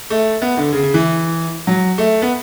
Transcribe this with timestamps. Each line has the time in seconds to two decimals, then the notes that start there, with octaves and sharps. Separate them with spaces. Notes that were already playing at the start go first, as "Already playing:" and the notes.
0.10 A3
0.42 B3
0.57 D3
0.72 C#3
0.83 C#3
0.94 E3
1.67 F#3
1.98 A3
2.22 B3